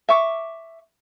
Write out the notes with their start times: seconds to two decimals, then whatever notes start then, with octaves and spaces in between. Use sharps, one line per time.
0.09 E5 C#6 D6